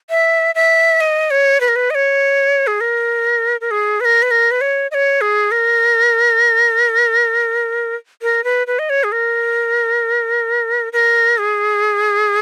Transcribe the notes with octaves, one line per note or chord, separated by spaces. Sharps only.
E5
E5
D#5
C#5
B4
A#4
B4
D#5
C#5
G#4
A#4
A#4
G#4
B4
A#4
B4
A#4
B4
C#5
D#5
C#5
G#4
A#4
A#4
B4
B4
D#5
C#5
G#4
A#4
A#4
G#4